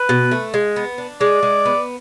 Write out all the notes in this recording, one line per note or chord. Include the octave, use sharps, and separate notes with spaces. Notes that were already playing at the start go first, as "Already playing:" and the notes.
Already playing: B4
B2
A3
G#3
B3
D4
G#3 D5
G#3
B3